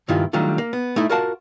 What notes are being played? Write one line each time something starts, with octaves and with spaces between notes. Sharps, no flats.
C#2 G2 D#3 A#3 E4 F4
D#3 F#3 G3 A3 D4 F4
A#3
B3
A3 D#4 E4
F4 F#4 A#4 F5 F#5 A5